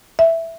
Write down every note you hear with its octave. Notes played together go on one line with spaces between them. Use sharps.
E5